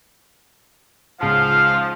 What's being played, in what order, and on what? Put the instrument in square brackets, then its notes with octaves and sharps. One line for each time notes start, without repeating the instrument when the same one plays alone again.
[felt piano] C#2 C#3 A5 [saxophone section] G#2 F3 [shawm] F4 [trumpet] F5